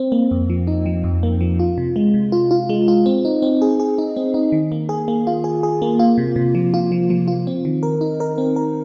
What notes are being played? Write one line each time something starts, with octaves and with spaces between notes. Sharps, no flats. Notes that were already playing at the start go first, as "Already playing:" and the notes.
Already playing: C4
A#3
F2
F3
D#4
F3
F2
A#3
F3
F4
C3
G#3
C3
F4
F4
G#3
F4
C4
D#4
C4
G#4
G#4
D#4
C4
D#4
D#3
A#3
G#4
A#3
F4
G#4
G#4
A#3
F4
C3
C3
F3
F4
F3
F3
F4
C4
D#3
A#4
D#4
A#4
C4
A#4